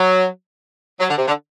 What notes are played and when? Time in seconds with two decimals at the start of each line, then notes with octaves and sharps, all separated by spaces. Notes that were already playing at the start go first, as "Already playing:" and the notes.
Already playing: F#3
1.00 F#3
1.10 D3
1.18 C3
1.28 D3